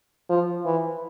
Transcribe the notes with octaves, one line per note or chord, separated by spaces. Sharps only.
F3
E3